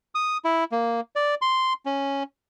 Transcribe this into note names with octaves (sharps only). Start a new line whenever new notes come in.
D#6
E4
A#3
D5
C6
C#4